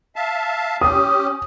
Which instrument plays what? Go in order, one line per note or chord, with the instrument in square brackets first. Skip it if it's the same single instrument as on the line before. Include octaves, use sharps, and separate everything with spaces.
[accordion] E5 F5 A5
[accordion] C#4 G4 [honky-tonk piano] D#6